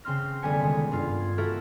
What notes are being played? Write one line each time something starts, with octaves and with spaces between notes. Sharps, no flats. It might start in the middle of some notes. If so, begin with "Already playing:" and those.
C#3 C4 C6 F6 A#6
F1 D3 G3 B3 G#5 C#7
D#3 G#3
G2 F4
G#6
B3 F#4 A4 A#4 E5